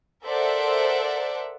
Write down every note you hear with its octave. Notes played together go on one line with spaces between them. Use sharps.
A4 A#4 C5 D5 E5 F#5